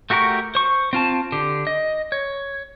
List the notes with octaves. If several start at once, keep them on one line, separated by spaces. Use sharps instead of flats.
A3 F#4 G4 A#4 C#6
C5 C#6
C4 F4 A5
D3 G4
D#5
C#5